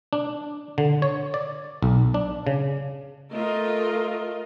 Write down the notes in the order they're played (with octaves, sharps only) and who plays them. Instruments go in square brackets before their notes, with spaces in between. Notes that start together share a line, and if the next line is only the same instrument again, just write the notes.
[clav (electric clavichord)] D4
D3
C#5
D5
B1
D4
C#3
[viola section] A3 F4 A#4 D#5